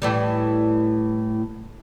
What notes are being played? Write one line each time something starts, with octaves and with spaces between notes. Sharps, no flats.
A2 E3 G3